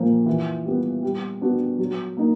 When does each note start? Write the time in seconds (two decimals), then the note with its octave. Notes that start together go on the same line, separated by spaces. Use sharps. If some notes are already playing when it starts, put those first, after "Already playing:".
Already playing: A#2 F3 A#3
0.26 E3
0.65 G3 B3
1.03 G3
1.42 B3 D4 F#4
1.79 F#3
2.17 A#3 D#4